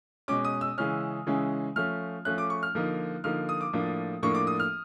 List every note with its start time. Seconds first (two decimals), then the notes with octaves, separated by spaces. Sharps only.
0.28 B2 G#3 C#4 D6
0.45 D#6
0.61 E6
0.78 C#3 E3 G#3 C#4 F6
1.27 C#3 E3 G#3 C#4
1.76 F3 A3 C#4 F6
2.25 F3 A3 C#4 F#6
2.38 D6
2.50 C#6
2.63 F6
2.75 D3 F3 A#3 D#4
3.24 D3 F3 A#3 D#4 F6
3.49 D#6
3.61 D6
3.73 A2 F3 A#3 D4
4.23 A2 F3 A#3 D4 C#6
4.35 D6
4.47 D#6
4.60 F6